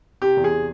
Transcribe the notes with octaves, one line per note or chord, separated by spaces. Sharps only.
C3 G4
E2
G#4
C3